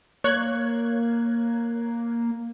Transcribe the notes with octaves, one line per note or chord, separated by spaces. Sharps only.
A#3 C#5 F#6 G#6